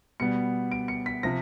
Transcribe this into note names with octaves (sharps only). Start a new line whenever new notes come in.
B2 G3 B3 C#7
D7
C#7
B6
C3 F3 A#6